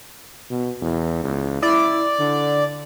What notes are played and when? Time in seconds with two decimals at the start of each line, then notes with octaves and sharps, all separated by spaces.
0.50 B2
0.82 E2
1.24 C#2
1.62 E4 D5
2.20 D3